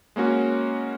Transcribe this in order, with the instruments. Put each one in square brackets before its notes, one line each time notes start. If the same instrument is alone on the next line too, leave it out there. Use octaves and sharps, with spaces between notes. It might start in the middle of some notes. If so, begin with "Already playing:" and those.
[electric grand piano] G#3 A#3 C#4 F#4